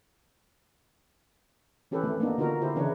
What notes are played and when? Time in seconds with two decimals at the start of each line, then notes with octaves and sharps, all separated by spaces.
1.91 E3 C#4 G4 A4 B4
2.04 D#3 A3 C4
2.20 A#3 B3 D4 D#4
2.38 D3 D#4 F4 F#4 A#4
2.61 D3 E4 G4 C5
2.76 C#3 E3 D4 D#4 B4 C#5